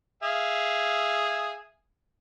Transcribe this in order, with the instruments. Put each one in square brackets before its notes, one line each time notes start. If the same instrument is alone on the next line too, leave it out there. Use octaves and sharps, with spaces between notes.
[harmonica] G#4 E5 F5